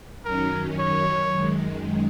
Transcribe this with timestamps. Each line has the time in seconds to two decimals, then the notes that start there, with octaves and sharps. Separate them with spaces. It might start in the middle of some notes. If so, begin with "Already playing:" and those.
0.25 F#2 D#3 F#3 C#4 A#4
0.79 C#5
1.33 F#2 D#3 G#3